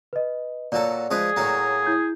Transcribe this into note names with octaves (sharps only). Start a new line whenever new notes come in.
B4 D#5
A#2 F#3 A4 D5
F3 G#3 G#4 B4
A2 F#3 A#3
E4 G6